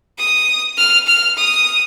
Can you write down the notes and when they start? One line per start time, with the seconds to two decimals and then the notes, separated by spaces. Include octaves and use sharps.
0.18 D#6
0.78 F6
1.07 F6
1.37 D#6